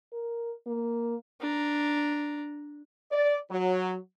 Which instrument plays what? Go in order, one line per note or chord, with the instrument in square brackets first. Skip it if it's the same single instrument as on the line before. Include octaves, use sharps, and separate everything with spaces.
[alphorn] A#4
A#3
[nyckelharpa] D4 A#5
[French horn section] D5
F#3